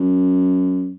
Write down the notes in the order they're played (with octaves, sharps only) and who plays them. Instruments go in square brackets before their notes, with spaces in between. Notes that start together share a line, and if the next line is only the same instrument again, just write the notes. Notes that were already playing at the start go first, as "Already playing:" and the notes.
Already playing: [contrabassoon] F#2